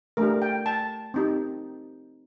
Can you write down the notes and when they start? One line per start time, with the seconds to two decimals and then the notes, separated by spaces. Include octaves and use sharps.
0.17 A3 D4 G4 A#4
0.42 G5
0.66 A5
1.14 C4 D#4 G4